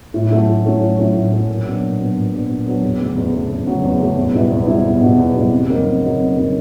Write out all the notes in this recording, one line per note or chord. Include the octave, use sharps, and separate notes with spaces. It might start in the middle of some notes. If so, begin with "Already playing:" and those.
A2
F#3 A3 C#4 E4
A2
F#3 A3 C#4 E4
A2
F#3 A3 C#4 E4
A2
F#3 A3 C#4 E4
A#2
F#3 B3 D4
A#2
F#3 B3 D4
A#2
F#3 B3 D4
A#2
F#3 B3 D4
E2
C#3 F#3 A3
E2
C#3 F#3 A3
E2
C#3 F#3 A3
E2
C#3 F#3 A3
E2
B2 G3 B3 E4
E2
B2 G3 B3 E4
E2
B2 G3 B3 E4
E2
B2 G3 B3 E4
F2
C#3 F#3 A#3 D#4
F2
C#3 F#3 A#3 D#4
F2
C#3 F#3 A#3 D#4